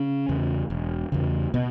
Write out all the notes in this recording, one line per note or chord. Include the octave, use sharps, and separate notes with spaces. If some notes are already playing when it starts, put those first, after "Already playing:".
Already playing: C#3 C#4
E2 C#3
E1
E2 C#3
B2 B3